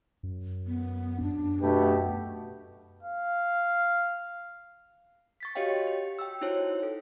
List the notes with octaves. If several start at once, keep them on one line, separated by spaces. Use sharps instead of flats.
F#2
B3
F#2 D4
B2 A3 B3 G4
F5
C#6 A6 B6
F#4 G4 C#5 D#5 F5 G5
G4
G5 E6
D#4 E4 F#4 C5 C#5
A4